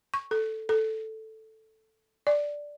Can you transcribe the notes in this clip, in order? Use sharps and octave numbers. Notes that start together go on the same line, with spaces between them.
C#6
A4
A4
D5